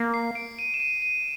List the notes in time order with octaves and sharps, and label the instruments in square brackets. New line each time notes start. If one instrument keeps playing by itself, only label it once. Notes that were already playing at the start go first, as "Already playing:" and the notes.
Already playing: [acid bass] A#3
[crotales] C7
D7
D#7
E7
D#7
D#7